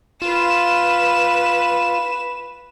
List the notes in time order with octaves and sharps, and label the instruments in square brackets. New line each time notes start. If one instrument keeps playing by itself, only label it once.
[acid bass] F4 [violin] B4 E7